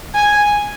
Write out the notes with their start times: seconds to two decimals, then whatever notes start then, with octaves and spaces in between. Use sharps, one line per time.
0.15 G#5